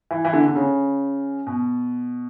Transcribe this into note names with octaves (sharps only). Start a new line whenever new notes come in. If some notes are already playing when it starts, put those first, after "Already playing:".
E3
E3
D3
D3
C#3
B2